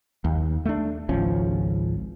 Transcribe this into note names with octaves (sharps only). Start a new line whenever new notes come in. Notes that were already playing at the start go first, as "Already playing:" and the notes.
D#2
A3 D4
G#1 C#2 F3 C#4